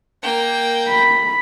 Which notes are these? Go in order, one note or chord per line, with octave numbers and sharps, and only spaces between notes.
A#3 G5
B5